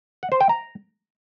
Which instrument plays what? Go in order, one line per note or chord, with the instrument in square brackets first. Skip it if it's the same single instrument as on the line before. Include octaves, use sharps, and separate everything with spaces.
[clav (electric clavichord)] F#5
C5
G5
A#5